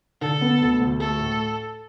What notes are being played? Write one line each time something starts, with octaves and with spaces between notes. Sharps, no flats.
D3 A4
B3
D2
D2
A3 A4
A2